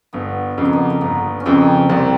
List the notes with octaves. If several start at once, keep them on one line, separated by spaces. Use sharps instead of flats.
G1 B3
F2 C#3 A#3
B3
A#3
A#3
G1 B3
C#4
F2 C#3 A#3 C4
C2 A#3 C4